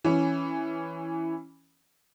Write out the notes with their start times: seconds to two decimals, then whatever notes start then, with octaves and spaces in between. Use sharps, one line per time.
0.05 E3 C#4